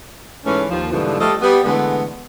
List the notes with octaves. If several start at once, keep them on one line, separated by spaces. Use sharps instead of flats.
G#2 E3 A3 C#4
D#2 F3
G#2 B2 D3 E3 F3 G3
F3 G3 A3 A4 D#5 F5
G3 B3
D3 E3 G#3 A3 B3